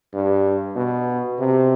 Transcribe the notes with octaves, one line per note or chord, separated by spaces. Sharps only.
G2
B2
C3